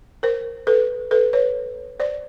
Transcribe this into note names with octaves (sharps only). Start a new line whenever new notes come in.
A#4 C5
A4 B4
A4 B4
B4 C#5
C5 D5